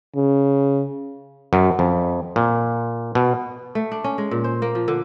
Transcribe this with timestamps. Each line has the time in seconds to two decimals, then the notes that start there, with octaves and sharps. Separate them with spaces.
0.16 C#3
1.53 F#2
1.79 F2
2.36 A#2
3.15 B2
3.75 A3
3.92 D4
4.04 C#4
4.18 G#3
4.31 A#2
4.44 C5
4.62 A#3
4.75 F3
4.88 D3